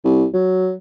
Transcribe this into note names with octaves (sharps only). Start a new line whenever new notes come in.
C2
F#3